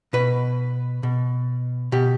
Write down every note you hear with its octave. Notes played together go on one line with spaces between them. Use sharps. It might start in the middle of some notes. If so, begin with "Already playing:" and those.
B2 B4
B2
B2 G4